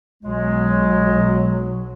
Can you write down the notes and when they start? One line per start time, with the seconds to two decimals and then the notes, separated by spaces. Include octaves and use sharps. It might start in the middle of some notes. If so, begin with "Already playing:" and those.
0.24 B1 F#3 G#3